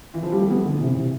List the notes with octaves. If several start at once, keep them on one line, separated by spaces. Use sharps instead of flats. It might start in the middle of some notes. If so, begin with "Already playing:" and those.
E3
F3
G3
A3
G3 B3
D3
C3 E3
C3 E3